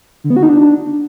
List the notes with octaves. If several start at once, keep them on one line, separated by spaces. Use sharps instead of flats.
D3
B3
F#4
D#4
D4